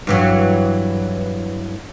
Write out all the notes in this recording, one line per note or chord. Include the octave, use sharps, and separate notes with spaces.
G2 E3 F#3